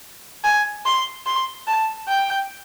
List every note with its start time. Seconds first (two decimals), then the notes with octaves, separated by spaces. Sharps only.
0.44 G#5
0.86 C6
1.26 C6
1.67 A5
2.08 G5